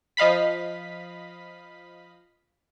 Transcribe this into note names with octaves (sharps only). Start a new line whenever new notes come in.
F3 D#5 F5 B5 B6